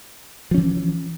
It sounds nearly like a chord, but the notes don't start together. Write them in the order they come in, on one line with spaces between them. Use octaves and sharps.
F3 C#4 E3